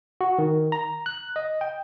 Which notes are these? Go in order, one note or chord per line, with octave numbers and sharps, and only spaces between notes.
F#4
D#3
A#5
F#6
D#5
G5